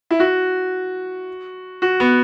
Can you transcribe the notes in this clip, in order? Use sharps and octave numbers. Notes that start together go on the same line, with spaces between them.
E4
F#4
F#4
B3